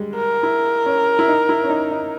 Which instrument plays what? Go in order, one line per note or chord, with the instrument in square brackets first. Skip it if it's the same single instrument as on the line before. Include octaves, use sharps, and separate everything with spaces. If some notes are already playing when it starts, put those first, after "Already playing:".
Already playing: [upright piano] G3 G#3
[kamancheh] A#4
[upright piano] E4
C#4
E4
D#4
E4
C#4
D#4
D#4